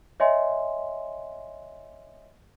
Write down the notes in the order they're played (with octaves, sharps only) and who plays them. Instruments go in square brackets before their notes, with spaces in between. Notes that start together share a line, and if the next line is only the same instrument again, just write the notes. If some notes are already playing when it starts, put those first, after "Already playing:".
[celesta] C#5 D#5 E5 G#5 C6